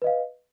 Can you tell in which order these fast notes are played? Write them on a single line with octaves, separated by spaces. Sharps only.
B4 D#5 F5